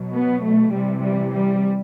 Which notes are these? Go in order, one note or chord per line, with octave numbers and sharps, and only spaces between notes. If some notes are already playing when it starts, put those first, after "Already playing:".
Already playing: B2 F#3
B3
A3
C3 E3 G3
G3
G3